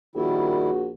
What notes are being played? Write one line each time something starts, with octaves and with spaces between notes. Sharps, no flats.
A#1 D#3 G3 E4 F#4